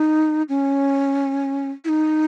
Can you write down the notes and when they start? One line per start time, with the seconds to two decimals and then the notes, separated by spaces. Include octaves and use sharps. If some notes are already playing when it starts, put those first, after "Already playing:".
Already playing: D#4
0.49 C#4
1.85 E4
1.88 D#4